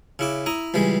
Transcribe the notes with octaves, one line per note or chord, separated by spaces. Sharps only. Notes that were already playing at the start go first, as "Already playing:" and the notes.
C#3 E4 D6
E4 A#5 D#6
C#2 E3 G3 G#3